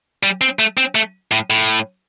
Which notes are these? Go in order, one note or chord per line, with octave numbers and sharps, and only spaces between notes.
G3
C4
A3
C4
A3
A2
A2